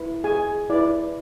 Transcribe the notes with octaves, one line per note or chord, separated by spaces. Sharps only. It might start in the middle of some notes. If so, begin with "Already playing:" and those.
Already playing: E4 B4
G#4 G#5
E4 B4 D5